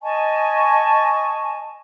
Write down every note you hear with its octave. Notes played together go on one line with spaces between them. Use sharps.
D#5 G#5 A5 C#6